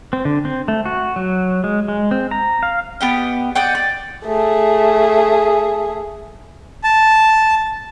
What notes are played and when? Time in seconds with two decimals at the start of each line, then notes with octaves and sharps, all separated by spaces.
0.13 C4
0.25 D3
0.45 C4
0.68 A3
0.86 F#4
1.16 F#3
1.64 G#3
1.88 G#3
2.11 C4
2.31 A#5
2.63 F5
3.01 B3 G4 D#5
3.55 D5 D#5 F#5 G5
3.75 D5
4.25 A3 G#4
6.84 A5